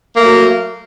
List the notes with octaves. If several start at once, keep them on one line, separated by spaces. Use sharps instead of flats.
F#3 A3 A#3